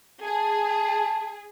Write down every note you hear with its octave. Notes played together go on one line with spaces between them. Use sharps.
G#4 A5